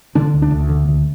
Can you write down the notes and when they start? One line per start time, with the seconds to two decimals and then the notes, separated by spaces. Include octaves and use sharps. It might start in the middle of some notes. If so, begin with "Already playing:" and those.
0.15 D3 D4
0.34 D2
0.42 D4
0.51 D2
0.69 D3
0.88 D2